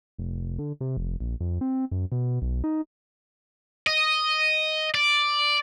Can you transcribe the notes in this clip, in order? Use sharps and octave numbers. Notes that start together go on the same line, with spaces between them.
F1
D3
C3
F1
A#1
F2
C4
F#2
B2
B1
D#4
D#5
D5